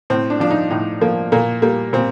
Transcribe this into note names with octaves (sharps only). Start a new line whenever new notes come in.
A2 C4
D4
F3 D4
D#4
A2 D#4
F3 A#3
A#2 A#3
G3 A#3
A#2 C4